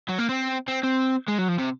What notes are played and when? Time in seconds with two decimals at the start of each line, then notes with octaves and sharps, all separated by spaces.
0.09 F#3
0.18 A#3
0.29 C4
0.68 C4
0.84 C4
1.28 G#3
1.38 F#3
1.48 F3
1.58 C3